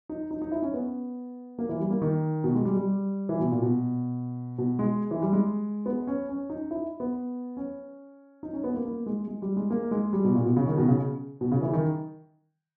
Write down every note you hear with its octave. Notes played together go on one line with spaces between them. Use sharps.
D#4
D#4
D#4
E4
C#4
B3
A#3
E3
G3
A#3
D#3
B2
G#3
G3
G3
E3
B2
A#2
B2
B2
G#3
E3
G3
G#3
B3
C#4
C#4
D#4
E4
B3
C#4
D#4
C#4
B3
A#3
A#3
G#3
G#3
G3
G#3
A#3
G#3
G3
B2
A#2
B2
C#3
D#3
B2
C#3
B2
C#3
E3
D#3